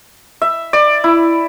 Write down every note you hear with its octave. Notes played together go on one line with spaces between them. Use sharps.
E5
D5
E4